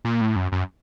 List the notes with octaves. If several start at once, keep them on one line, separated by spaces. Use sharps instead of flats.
A#2
A2
F#2
F#2